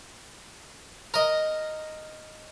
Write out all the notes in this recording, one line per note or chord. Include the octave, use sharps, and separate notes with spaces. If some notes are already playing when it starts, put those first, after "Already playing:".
A#4 D#5